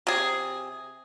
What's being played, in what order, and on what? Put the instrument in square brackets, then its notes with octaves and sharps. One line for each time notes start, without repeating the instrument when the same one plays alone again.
[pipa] C3 G#4